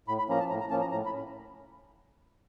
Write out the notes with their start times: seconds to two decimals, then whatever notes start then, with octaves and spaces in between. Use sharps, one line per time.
0.08 A2 B5
0.19 B5
0.29 F3 A#3 C#4 A#5
0.39 A5
0.50 A2 A#5
0.61 A#5
0.71 F3 A#3 C#4 A5
0.81 A#5
0.92 A2 A#5
1.06 B5
1.12 C#4